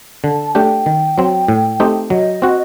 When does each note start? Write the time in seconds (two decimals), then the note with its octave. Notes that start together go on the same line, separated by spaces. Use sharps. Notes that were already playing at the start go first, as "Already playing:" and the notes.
0.24 D3 A5
0.55 A3 D4 G4 G5
0.86 D#3
1.18 F#3 C4
1.48 A2
1.80 A3 C4 D#4 G4
2.10 F#3 D#5
2.42 C4 F#4